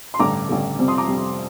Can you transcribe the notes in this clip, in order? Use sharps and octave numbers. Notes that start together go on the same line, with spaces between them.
C6
A1 G2 D3 A#5 D6
A1 G2 D3
F2 C3 G3
C6 D#6
A#5 D6
F2 C3 G3